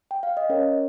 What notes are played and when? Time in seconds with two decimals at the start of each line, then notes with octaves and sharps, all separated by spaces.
0.11 G5
0.23 F5
0.37 D#5
0.49 C#4 A#4 C#5